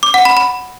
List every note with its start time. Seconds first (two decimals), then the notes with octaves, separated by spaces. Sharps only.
0.03 D6
0.14 F#5
0.25 B5
0.37 B5